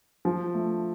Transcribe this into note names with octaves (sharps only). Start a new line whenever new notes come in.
F3
A3